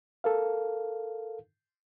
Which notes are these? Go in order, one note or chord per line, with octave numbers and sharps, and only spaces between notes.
A4 A#4 F5